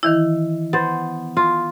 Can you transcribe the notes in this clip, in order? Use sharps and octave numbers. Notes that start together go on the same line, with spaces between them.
D#3 E3 E4
B3 C5 A6
F4